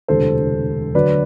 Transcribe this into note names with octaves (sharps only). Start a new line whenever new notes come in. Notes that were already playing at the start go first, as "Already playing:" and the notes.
E1 D2 C3 A4 C5
D2 D3 F#3 B4 D5